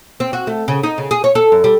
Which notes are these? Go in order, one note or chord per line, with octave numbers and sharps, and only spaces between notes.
C4
F#4
A3
C#3
D#4
C#3
G#4
C#5
A4
F#2
G3